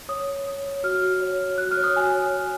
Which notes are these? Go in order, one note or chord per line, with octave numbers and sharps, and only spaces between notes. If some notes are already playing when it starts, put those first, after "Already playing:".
C#5 D#6
C#5
C#5
C#5
F#4 F6
F#4
C#5
C#5
F#4 F#6
F6
C#5
D#6
F#4 G#5
C#5
C#5